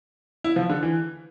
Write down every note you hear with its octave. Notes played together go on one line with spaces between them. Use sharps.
E4
F3
D3
E3